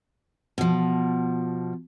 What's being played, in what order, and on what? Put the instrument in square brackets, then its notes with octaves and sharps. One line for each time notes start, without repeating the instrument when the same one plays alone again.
[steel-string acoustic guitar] B2 F3